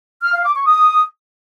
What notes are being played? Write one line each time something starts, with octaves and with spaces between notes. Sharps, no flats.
F6
F5
D6
C#6
D#6